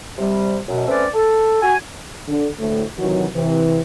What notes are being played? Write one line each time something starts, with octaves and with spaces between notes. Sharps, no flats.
C3 G3
F#2 B2
A3 C4 C#4 B4 D5
A4
F#4 G#5
D3
D2 A2
C3 D#3 E3 F#3
C3 E3